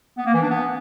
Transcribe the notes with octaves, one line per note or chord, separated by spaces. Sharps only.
B3
A#3
E3
D4
B3